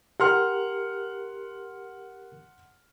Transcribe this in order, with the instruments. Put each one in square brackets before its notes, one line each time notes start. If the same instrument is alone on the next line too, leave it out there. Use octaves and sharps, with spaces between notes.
[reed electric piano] G4 A#4 [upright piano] F#5 C6 F6